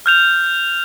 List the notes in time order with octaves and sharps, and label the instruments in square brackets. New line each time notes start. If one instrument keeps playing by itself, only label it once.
[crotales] F6 G6 F7